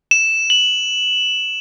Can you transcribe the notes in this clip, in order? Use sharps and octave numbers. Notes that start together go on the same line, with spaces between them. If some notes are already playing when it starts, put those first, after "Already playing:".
E7
F#7